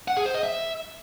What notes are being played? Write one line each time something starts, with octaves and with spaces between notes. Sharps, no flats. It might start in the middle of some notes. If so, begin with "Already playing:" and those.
F#5
G#4
C5
D#5
E5